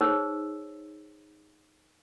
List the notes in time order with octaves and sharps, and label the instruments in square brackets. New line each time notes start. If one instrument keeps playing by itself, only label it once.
[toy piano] D#4 G#4 C5 C#5 E6